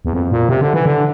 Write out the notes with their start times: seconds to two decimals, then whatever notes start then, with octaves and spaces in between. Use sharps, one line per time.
0.05 E2
0.13 F2
0.32 A#2
0.49 C3
0.61 D3
0.74 E3
0.86 D3